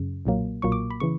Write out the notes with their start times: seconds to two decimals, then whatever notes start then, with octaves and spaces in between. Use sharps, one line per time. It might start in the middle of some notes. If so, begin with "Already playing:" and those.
Already playing: F#2 C#3
0.25 B1 A#2 F#3 A#3
0.62 B1 A#2 F#3 A#3 C#6
0.72 D6
0.90 B5
1.00 C#3 E3 C#6